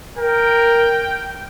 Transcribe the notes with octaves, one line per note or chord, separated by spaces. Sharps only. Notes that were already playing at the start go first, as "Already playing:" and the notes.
A#4 G5